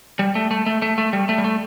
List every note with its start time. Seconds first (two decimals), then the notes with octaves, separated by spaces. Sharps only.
0.19 G3
0.35 A3
0.51 A3
0.66 A3
0.82 A3
0.98 A3
1.13 G3
1.29 A3
1.38 G3
1.44 A3